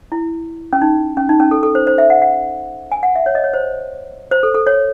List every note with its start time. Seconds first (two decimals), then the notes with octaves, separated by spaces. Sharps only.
0.12 E4
0.73 C#4
0.82 D#4
1.17 C#4
1.29 D#4
1.40 C#4
1.51 A4
1.63 A4
1.75 C5
1.87 C5
1.98 E5
2.10 F#5
2.22 F#5
2.92 G#5
3.03 F#5
3.15 E5
3.26 C#5
3.35 D#5
3.44 C#5
3.54 C5
4.31 C5
4.43 A4
4.55 A4
4.67 C#5